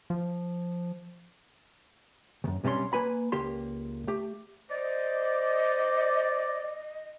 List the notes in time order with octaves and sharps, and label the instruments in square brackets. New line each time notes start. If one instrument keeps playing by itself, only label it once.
[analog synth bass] F3
[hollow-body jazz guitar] C#2 F#2
B1 C3 G3 C#4 C6
A#3 B4 G#5 B5
C#2 A#3 G4 C6
A3 G4
[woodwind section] C5 D5 [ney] D#5